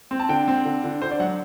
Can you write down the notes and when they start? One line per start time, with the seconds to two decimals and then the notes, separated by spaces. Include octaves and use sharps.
0.11 C4
0.20 A5
0.29 D3 G5
0.48 C4
0.65 D3
0.84 D3
1.02 D3 C5
1.11 D5
1.19 F#3 F#5